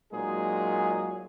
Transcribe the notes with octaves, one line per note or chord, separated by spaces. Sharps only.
A#2 F#3 G#3 D#4 G#4